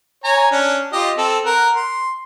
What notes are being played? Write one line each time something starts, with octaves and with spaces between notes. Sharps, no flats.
C#5 G#5 A#5
C#4 D4
F4 G4 D#5
C4 A4
A#4 F#5
C6